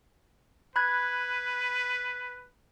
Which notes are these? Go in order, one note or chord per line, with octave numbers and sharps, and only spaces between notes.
B4 B5 F#6 G#6